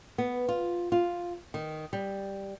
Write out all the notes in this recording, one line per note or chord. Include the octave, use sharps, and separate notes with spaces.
B3
F4
F4
D#3
G3